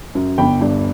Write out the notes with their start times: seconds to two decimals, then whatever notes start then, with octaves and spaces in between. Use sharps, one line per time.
0.15 F#2
0.38 G1 G5 B5
0.61 G2